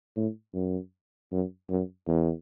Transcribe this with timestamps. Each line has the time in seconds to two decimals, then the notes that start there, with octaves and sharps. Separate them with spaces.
0.16 A2
0.54 F#2
1.32 F#2
1.70 F#2
2.08 E2